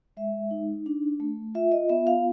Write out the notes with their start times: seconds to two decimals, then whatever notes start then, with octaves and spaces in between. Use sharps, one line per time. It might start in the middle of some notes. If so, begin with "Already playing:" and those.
0.17 G#3 E5
0.51 D#4
0.86 D4
1.20 A3
1.55 F4 E5
1.72 D#5
1.89 B3 E5
2.07 F5